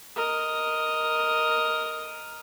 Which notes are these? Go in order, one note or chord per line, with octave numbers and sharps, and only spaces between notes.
A#4 D#5